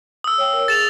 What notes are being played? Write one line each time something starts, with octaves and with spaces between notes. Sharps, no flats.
D#6 E6
C#5 F5 G5
A#4
G#4 A6 E7 F7